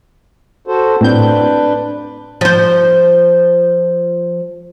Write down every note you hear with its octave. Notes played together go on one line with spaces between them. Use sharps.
F#4 A4 C5
A2 C4 D4 B4 G6
F3 C5